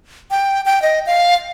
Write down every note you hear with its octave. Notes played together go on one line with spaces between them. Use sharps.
G5
G5
D#5
F5